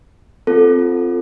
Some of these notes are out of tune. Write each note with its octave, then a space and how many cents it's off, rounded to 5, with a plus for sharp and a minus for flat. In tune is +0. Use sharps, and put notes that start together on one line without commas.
C4 +0 F4 +0 A4 +0